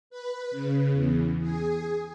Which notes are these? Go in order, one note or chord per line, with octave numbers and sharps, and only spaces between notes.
B4
C#3
E2
G#4